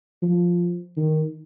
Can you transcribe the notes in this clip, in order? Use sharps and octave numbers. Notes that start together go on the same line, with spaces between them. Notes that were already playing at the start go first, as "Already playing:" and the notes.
F3
D#3